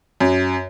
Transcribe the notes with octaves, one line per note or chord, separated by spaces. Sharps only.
F#2